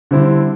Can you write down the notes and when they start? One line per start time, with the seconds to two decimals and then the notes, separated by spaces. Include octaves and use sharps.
0.11 D3 G3 C4 E4 G4